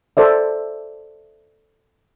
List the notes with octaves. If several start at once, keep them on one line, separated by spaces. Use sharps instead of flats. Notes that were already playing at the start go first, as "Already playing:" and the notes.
A4 C5 D5 E5